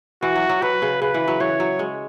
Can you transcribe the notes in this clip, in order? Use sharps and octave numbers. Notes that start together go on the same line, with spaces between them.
E3 F#4
F#3
F#3
F#3 B4
C#3
C#3 B4
E3
F#3
E3 C#5
F#3
G#3